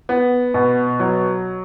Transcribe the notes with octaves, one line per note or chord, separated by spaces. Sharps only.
B3
B2
F#3